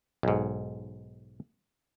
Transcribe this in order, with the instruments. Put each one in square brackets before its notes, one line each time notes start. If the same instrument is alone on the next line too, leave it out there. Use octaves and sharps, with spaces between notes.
[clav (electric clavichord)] B1 G#2